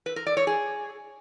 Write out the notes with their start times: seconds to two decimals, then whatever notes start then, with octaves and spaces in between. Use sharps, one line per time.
0.06 B4
0.16 A#4
0.27 D5
0.37 C#5
0.47 G#4